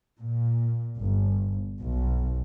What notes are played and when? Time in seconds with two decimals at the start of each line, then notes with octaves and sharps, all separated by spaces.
0.20 A#2
0.96 G1
1.82 B1